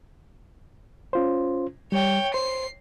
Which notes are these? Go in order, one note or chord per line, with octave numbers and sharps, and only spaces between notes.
C#4 F4 C5
G3 C#5 G5
C5 C7